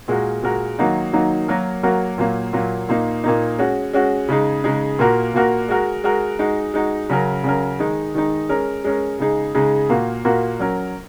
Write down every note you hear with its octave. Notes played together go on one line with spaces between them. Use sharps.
A#2 G#3 F#4 A#4
A#2 G#3 F#4 A#4
D#3 F#3 A#3 D#4 F#4
D#3 F#3 A#3 D#4 F#4
F#3 A#3 F#4 A#4
F#3 A#3 F#4 A#4
A#2 F#3 A#3
A#2 F#3 A#3
A#2 A#3 D#4
A#2 A#3 D#4
G#3 C#4 F#4
G#3 C#4 F#4
C#3 G#3 D#4 G#4
C#3 G#3 D#4 G#4
A#2 A#3 F#4 A#4
A#2 A#3 F#4 A#4
G#3 F#4 A#4
G#3 F#4 A#4
G#3 D#4 F#4
G#3 D#4 F#4
C#3 F#3 C#4 A#4
C#3 F#3 C#4 A#4
D#3 G#3 D#4
D#3 G#3 D#4
G#3 C#4 A#4
G#3 C#4 A#4
C#3 G#3 D#4 G#4
C#3 G#3 D#4 G#4
A#2 A#3 F#4 A#4
A#2 A#3 F#4 A#4
F#3 C#4 A#4